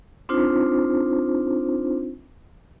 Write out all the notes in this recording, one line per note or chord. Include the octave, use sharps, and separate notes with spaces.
C4 D4 D#4 F4 C5